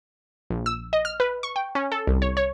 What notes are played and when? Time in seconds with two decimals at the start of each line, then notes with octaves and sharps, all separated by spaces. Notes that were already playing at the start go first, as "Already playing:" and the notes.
0.50 A#1
0.66 E6
0.93 D#5
1.05 F6
1.20 B4
1.43 C#6
1.56 G5
1.75 C#4
1.92 A4
2.07 C2
2.22 C#5
2.37 C#5